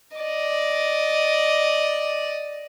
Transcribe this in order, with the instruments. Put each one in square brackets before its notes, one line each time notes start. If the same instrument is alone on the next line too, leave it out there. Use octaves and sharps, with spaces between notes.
[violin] D5 D#5